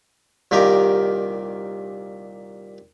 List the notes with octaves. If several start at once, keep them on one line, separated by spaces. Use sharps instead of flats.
C2 A#2 D#3 G4 A#4